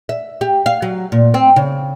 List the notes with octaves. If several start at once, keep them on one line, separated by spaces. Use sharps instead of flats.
E5
G4
F5
F#3
A#2
C4
C#3